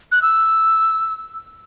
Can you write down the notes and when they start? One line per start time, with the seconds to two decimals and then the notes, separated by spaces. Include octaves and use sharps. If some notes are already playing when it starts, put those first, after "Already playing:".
0.12 F#6
0.22 E6